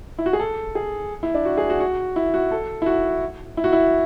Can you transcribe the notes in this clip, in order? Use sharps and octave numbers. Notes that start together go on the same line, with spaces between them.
E4
F#4
G#4
A4
G#4
E4
D4
F#4
G#4
F#4
F#4
E4
F#4
A4
E4
F#4
E4
F#4
E4